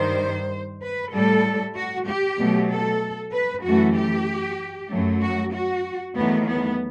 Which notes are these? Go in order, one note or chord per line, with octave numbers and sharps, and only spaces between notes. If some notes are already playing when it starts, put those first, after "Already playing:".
Already playing: G2 D#3 G3 C5
B4
A2 G3 A4
F#4
G4
B2 F#3 A3
A4
B4
F#2 E3 A3 F#4
G4
F#2 F#3 A3
F#4
F#4
E2 D#3 F#3 A3 B3
B3